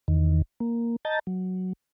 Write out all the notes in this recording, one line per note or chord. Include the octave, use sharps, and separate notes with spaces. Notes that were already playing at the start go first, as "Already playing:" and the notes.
E2 D#3
A#3
D#5 A5 A#5 G6 A6
F#3